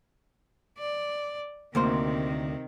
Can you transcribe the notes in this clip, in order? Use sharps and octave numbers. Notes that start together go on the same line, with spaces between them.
D5
D2 C3 D#3 A#3 C5